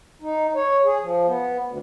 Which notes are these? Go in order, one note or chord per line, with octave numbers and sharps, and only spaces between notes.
D#4
C#5
G#4
F3
B3
D2